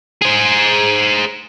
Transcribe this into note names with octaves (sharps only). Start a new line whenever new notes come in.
G#4 C5